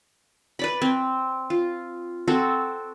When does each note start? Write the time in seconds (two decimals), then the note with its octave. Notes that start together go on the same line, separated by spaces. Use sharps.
0.59 B4 D5 B5
0.82 C4
1.50 F4
2.28 C4 F#4 A4